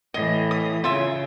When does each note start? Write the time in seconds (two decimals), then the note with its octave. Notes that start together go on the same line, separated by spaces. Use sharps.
0.14 A2 E3 D#5
0.51 D#6
0.84 C#3 F4 E5